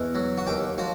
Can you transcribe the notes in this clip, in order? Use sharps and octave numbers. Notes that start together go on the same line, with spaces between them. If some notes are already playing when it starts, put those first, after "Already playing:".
Already playing: E2 B2
F#3
F#4
D#2 G4
F3 F#4